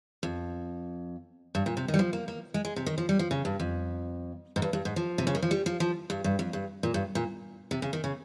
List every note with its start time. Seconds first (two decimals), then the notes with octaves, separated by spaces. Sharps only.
0.23 F2
1.55 G2
1.66 A#2
1.77 C3
1.88 D#3
1.94 G3
1.99 F3
2.13 A#3
2.28 A#3
2.54 G#3
2.65 G#3
2.76 C3
2.86 D#3
2.98 F3
3.09 G3
3.19 F3
3.31 C#3
3.45 G2
3.60 F2
4.56 G#2
4.62 G2
4.73 G2
4.85 G#2
4.96 F3
5.18 C3
5.27 C#3
5.35 D#3
5.42 F3
5.51 G3
5.66 F3
5.80 F3
6.10 G2
6.24 G2
6.39 F2
6.53 G2
6.83 A#2
6.94 G2
7.15 A#2
7.71 C3
7.82 C#3
7.93 D#3
8.04 C#3